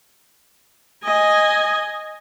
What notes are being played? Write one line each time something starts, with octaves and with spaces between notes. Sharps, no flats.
D#5 G#5